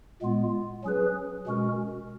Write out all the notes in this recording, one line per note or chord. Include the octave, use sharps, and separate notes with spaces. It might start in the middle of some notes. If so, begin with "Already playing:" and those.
A#2 G#3 B3 F4
F#3 C#4 G#4 B4
B2 G#3 C#4 F#4 A#4